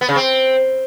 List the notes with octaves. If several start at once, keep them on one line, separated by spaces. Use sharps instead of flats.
B3
C#3
C4